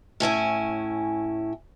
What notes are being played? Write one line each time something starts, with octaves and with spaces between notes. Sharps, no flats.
A2 C#4 E4 G#5